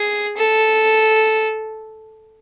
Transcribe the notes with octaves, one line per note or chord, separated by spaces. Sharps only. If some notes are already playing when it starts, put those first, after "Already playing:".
Already playing: G#4
A4